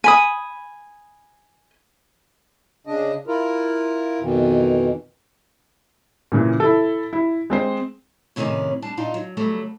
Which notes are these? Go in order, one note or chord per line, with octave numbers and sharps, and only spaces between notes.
G#5 B5 D#6
C#3 D4 D#5
E4 F4 A#4
F2 B2 D#3 E3
A#2 C#3 E3
E4 A4
E4
G#3 C4 C5
A2 C3 D#3 G3 C#4 D5
G3 D4 A5
A#2 D4 D#4 F4
F#3
C#3 F#3 G3 A3 B3